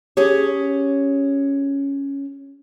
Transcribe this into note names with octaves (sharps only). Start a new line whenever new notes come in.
C#4 G4 G#4 C#5